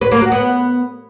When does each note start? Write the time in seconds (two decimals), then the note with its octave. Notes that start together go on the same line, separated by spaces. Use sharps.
0.01 B4
0.12 A#3
0.22 F#4
0.32 B3